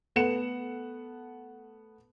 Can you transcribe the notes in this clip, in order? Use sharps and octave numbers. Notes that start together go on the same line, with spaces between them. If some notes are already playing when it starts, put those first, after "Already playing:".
A3 B3 F#5 C#7 E7